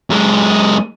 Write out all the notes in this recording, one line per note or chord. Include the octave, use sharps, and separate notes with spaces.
F#2 G#3